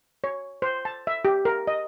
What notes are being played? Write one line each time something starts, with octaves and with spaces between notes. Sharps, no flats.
C#5
C5
A5
E5
G4
A#4
D#5